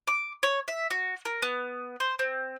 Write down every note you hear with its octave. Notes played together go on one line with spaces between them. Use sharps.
D6
C#5
E5
F#4
A#4
B3
C5
C4